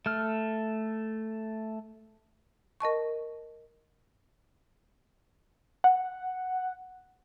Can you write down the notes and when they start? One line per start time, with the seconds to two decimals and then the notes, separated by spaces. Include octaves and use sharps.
0.06 A3 F6
2.80 A#4 D#5 A5 C#6
5.84 F#5